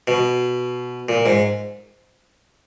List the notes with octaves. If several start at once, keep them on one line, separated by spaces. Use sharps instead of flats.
B2
A#2
G#2